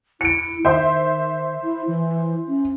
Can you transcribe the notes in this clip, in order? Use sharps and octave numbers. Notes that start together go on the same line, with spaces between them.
E4 C#7 D7
D#3 C5 E5 C6
E4
E3
C#4